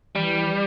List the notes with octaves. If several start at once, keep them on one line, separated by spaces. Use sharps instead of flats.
E3 G3